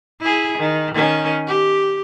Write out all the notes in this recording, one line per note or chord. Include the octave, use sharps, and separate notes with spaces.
E4 G#4
D#3
D#3 C#4
G4